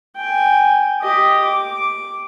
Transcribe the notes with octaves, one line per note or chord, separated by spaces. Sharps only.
G5 G#5
G4 D#5
D6